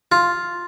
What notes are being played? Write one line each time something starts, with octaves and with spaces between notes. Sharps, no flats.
F4